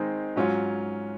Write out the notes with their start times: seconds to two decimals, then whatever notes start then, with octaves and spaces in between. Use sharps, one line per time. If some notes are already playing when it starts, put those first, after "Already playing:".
Already playing: D#3 G#3 C4 D#4
0.36 G#2 F#3 C#4 F4